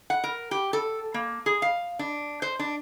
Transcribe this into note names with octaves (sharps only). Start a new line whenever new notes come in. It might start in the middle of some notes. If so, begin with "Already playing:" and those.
F#5
A#4
G4
A4
A#3
G#4
F5
D4
C5
D4